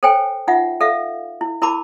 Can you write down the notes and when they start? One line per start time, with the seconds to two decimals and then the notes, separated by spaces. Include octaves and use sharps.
0.03 A4 C5 C#5 G5 G#5
0.48 D#4 F4 E5 F#5
0.81 A4 E5 F5
1.41 E4
1.62 E4 A#4 A5 B5 D6